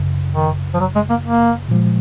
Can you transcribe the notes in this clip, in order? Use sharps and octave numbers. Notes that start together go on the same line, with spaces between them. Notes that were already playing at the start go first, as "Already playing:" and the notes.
Already playing: G#1 F#2 C#3
D#3
F3
F#3
G#3
A#3
A#3
A#2 F3 G#3